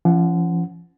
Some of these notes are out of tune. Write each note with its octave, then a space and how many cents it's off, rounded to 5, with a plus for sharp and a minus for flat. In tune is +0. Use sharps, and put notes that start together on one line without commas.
F3 -40 C#4 +0 F#5 +0